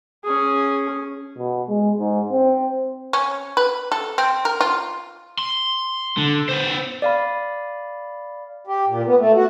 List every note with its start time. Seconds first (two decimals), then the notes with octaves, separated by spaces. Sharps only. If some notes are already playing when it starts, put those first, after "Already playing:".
0.24 C#4 G#4
1.38 B2
1.68 G#3
2.00 G#2
2.32 C4
3.13 C#4
3.57 B4
3.92 A4
4.18 C4
4.45 A#4
4.61 F4
5.39 C6
6.17 D3
6.49 B3 C5
7.02 D5 F5 B5
8.67 G4
8.87 A#2
9.06 B3
9.18 A3
9.35 F#4